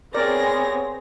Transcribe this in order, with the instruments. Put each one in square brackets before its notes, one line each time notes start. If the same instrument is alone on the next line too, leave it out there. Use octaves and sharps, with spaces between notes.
[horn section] B3 G4 C#5 [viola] C4 [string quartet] G#4 A#6 [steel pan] A#4 D5